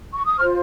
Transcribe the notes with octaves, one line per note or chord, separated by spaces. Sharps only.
C#6
D#6
C5 C#6 F6
F4